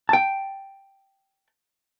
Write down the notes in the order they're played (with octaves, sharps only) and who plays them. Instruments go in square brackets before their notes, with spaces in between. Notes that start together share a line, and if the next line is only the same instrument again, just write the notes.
[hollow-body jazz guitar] G5 A5